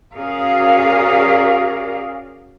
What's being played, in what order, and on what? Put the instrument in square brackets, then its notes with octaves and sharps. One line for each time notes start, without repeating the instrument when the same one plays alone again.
[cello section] C#4 F#4 G#4 A#4 D5 F5